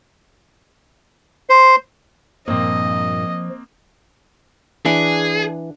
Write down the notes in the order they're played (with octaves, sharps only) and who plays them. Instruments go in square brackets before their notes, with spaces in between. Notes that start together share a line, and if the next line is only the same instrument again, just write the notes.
[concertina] C5
[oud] G2 A#2 [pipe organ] F3 [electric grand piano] A#3 C4 [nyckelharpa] D#5
[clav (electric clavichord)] E3 [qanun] D4 F#5 [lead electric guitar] G#4